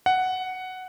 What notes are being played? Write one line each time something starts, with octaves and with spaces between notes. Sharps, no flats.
F#5